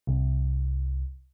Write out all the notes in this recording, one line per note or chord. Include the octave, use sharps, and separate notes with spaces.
C2